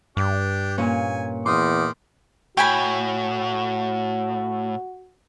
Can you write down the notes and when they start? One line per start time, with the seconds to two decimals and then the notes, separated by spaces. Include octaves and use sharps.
0.17 G2 D4 G4
0.78 A#2 C#4 G#5
1.46 E2 D#3 C6 D6 D#6
2.57 A2 F#4 G5 G#5 B5